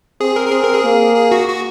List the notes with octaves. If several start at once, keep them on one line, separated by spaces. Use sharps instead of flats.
C4 G#4
A#4
A#4
C4 G#4
A#4
G#4
A#3
G#4
F#4
F#4